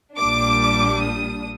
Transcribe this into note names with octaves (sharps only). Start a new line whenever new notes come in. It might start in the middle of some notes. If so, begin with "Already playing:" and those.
A#1 A#2 G3 D4 D6
D#6